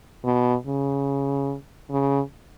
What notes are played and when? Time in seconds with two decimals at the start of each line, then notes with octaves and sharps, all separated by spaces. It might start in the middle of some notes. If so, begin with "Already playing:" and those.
0.25 B2
0.67 C#3
1.90 C#3